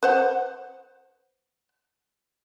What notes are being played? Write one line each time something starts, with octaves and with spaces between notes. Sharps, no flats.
B4 C5 F#5